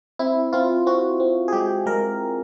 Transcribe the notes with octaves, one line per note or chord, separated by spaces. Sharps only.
C4 E4
C4 F4
C4 F#4
C4
G#4
G#3 G4
G#3 A#4